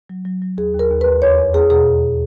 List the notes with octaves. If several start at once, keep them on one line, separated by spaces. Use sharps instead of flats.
F#3
F#3
F#3
D#2 G#4
D#2
A#4
D#2
B4
D#2
E2 C#5
E2
E2 G#4
B2 G#4